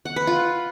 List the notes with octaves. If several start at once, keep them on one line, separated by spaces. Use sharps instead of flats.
F#5
B4
F4